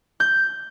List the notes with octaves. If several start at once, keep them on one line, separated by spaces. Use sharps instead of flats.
G6